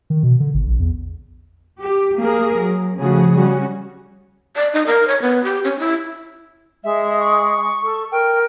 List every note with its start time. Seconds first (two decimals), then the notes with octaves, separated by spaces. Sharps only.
0.10 D#3
0.23 B2
0.40 D3
0.54 G#1
0.67 A#1
0.80 E2
1.79 G4
2.18 A#3 G#4 A#4
2.58 F#3
2.96 C#3 F3 A3 F#4 G#4
3.35 G3 C#4 F#4
4.56 D5
4.73 D#4
4.86 A#4
5.08 C#5
5.22 B3
5.44 G4
5.64 C#4
5.79 E4
6.84 G#3 E5
7.20 C#6
7.84 A4
8.12 A#4 G5